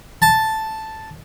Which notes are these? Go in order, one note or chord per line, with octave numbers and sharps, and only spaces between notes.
A5